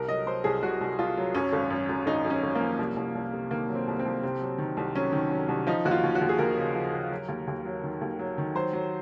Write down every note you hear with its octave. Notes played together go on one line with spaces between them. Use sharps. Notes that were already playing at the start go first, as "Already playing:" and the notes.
Already playing: C2 A#4
F#3 D#5
F#3 C5
C2 G#4
C2 F#4
C2
C2 F4
F#3
F#2 C#4
G#1
F#2
F#2
G#1 D#4
F#2
C#4
G#1
A#3
F3
C2
C2
C2
C3
D#3 A#3
F#3
C4
C2
C4
C2
C3 C4
F#3
D#3
C2
F#3 C#4
D#3
F#3
C2
F3 D#4
D#2 F#4
F4
D#2
F#4
D#2
G#4
D#2 A#4
C#3
F3
C#3
F#3
D#2
D#2
F#3
D#3
D#2
F#3
D#3
F#3 C5
F#3